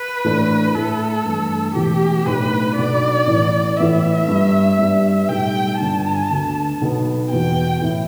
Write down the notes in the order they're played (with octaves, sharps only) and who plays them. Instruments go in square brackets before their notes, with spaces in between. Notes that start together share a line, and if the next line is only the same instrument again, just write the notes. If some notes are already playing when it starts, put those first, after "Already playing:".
Already playing: [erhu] B4
[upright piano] A2 E3 A3 D4
[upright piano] A2 A3 E4 [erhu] A4
[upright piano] G2 E3 A3
[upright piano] E1 E2 B2 A3 E4 [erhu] G4
[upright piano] B1 A2 A3 D4 [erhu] B4
[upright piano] B1 B2 B3 D4 [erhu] D5
[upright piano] A1 A2 E3
[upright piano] A2 E3 B3 E4 [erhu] E5
[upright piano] G2 G3 D4
G2 G3 B3 D4
[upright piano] B1 A2 G3 [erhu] G5
[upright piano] G1 G2 D3 B3 D4 [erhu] A5
[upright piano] D2 D3 B3
B1 B2 B3
[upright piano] E2 B2 B3 [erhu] G5
[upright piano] A2 E3 B3 E4